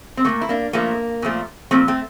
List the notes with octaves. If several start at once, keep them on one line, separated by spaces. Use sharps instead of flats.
C4
A#2 F3 A3 A#3
E4
A#3 D4
A#2 F3 A3 A#3
A#2 F3 A3
A#2 F3 A3 C4
A3 C4